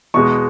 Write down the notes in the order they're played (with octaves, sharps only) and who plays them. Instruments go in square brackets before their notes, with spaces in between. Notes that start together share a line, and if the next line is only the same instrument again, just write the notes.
[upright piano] E2 B2 G#3 C#6